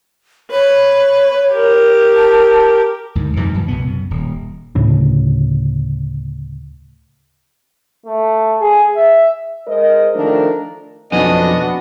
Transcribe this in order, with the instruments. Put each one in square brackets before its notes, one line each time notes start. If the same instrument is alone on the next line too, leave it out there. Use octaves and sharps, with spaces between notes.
[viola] B4 [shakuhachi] C#5
[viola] G4 A#4
[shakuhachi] A5
[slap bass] D2 G#2
F2 G#2 B2 E3
F#2 E3
C2 B2 B3
F#2
D#1
[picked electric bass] D2 A2 C#3
[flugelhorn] A3
G#4
E5
[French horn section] G#3 A#4 C5 D#5
D#3 F3 A3 D4 A4 A#4
[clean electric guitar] B1 F2 G#5 [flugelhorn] B3 [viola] D4 F#4 [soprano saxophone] D#5